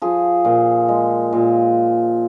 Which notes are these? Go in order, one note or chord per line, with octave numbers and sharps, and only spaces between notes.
F3 G#4
A#2
G#3
A#2